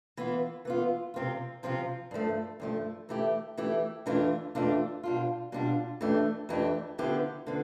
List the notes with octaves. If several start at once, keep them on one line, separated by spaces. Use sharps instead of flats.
E3 B3 F4
E3 B3 F4
C3 F3 C4 F4
C3 F3 C4 F4
G2 F3 A3
G2 F3 A3
E3 A3 E4 G4
E3 A3 E4 G4
F2 E3 A3 D4 F4
F2 E3 A3 D4 F4
B2 G3 D4 F4
B2 G3 D4 F4
F2 E3 A3 D4 G4
F2 E3 A3 D4 G4
D3 F3 B3 E4 G4
D3 F3 B3